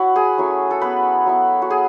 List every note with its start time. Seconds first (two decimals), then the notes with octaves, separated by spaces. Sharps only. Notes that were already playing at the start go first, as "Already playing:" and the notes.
Already playing: E4 F#4 B4 C#5
0.16 G#4
0.38 F#3 A3 C#4 E4
0.71 A4
0.81 B3 B4
1.26 F#3 B3 E4
1.62 F#4
1.70 G#4